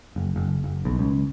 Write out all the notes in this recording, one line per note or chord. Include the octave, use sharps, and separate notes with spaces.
F#1
F#1
F#1
B1
C#2